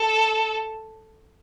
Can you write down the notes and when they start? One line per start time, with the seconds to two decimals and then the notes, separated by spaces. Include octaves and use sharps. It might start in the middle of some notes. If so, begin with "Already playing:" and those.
Already playing: A4